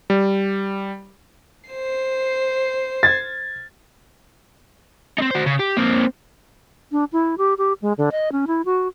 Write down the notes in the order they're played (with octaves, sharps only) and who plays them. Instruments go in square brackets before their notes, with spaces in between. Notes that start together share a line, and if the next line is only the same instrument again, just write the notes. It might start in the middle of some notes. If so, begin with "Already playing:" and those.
[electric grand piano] G3
[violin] C5 C7
[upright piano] G#6 A6
[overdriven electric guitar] C4 D#4
F#4 C5
C#3
G4
A#3 C4
[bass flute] D4
E4
G4
G4
G#3
D3
D#5
C#4
E4
F#4